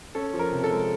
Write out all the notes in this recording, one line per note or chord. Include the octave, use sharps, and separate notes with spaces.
C#4 A4
F3
A#4
C3
A4
G#3